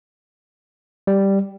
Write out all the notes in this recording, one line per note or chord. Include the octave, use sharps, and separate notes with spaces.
G3